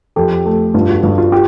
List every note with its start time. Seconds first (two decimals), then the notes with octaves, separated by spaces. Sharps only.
0.16 F2 G4 A4
0.46 A3
0.74 G2 F4
0.88 F#4
1.03 G2 F#4
1.18 F4
1.32 F4 G4